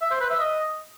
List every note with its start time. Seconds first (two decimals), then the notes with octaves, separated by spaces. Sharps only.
0.02 E5
0.11 C5
0.21 B4
0.30 E5
0.40 D#5